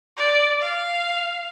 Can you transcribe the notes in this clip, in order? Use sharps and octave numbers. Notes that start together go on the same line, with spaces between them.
D5
F5